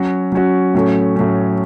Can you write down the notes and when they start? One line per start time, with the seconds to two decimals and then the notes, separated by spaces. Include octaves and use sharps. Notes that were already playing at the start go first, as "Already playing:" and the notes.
Already playing: F#3 C#4 F#4
0.32 F#3 C#4 F#4
0.74 A2 F#3 A3 C#4
1.16 A2 F#3 A3 C#4